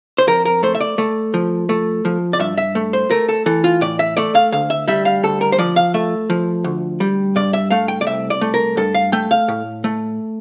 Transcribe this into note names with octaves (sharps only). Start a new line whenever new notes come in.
C5
F2 A#4
A#4
A3 C5
E5
D5
A3
F3
A3
F3
D5
G2 E5
E5
A3
C5
A3 A#4
A4
E3 A4
F4
A2 D5
E5
A3 D5
F5
D2 F5
E5
G3 E5
F5
D2 A4
A#4
C5
F3 D5
F5
A3 E5
F3
D2
G3
G2 D5
E5
A3 F5
G5
D5
C2 E5
D5
A3
A#4
G2 A4
F5
A3 G5
F5
A2
A3